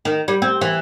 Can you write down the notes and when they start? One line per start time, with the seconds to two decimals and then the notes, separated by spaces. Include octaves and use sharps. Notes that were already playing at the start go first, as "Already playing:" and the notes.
0.05 D#3
0.28 G3
0.42 C4
0.61 E3